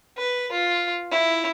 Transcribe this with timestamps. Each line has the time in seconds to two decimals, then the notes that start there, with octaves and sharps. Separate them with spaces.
0.18 B4
0.52 F4
1.11 E4